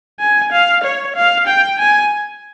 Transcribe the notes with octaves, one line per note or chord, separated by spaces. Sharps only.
G#5
F5
C#5
F5
G5
G#5